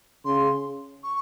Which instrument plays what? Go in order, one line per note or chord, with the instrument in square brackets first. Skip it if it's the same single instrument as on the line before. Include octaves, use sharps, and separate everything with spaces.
[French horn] C#3 [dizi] C6
[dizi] C#6